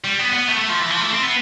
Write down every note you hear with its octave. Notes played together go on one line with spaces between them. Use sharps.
G3
B3
B3
A3
A3
F3
E3
F3
A3
C4
B3